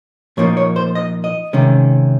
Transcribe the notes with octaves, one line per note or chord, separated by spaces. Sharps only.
A#2 F3 A#3 D#4 C#5
C#5
C5
D#5
D#5
C3 D#3 G#3 C#4